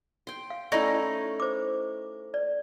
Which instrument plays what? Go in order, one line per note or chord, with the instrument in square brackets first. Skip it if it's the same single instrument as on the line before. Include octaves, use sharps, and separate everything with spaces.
[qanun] G5 C6
[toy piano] F5
[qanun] A3 C#4 E4 [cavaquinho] D#4 [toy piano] D5 C#6
[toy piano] C5 D6
D5